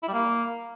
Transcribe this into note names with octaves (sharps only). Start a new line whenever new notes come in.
E4
G3
A#3